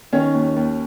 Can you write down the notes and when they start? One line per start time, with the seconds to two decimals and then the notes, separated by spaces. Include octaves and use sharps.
0.13 D#3 C#4 C#5
0.34 D#2
0.56 D#2